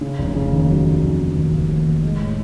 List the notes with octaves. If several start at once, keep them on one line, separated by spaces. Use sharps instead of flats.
C#3
F1
C#3
D#2
F#3
D#2
F1
C#3
D#2
F1
D#2
D#2
G#3
A2